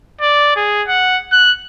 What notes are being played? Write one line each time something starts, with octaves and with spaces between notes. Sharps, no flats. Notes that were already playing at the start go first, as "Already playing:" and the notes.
D5
G#4
F#5
F#6